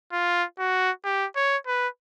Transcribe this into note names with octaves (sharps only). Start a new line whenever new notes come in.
F4
F#4
G4
C#5
B4